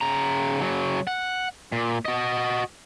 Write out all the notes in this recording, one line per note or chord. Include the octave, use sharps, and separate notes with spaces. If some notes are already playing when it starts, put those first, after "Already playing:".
C#3 A#5
C#3 F#3
F#5
A#2
F#4 D#5